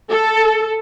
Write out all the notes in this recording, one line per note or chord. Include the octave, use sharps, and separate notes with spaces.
A4